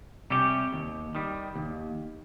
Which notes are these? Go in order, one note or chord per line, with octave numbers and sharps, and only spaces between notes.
C3 G3 C#4 G4
D#2
D#3 G3
D#2